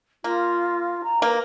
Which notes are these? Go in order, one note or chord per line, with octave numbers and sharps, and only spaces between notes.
A#3 F4
A#5
A#3 B4